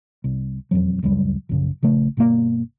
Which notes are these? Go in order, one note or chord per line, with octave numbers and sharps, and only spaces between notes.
C2
E1 F2 F#3
D1 C#2 F#2 G3
A#1 F#2 C#3
A#1 C#3 A3
G1 B2 E3 A#3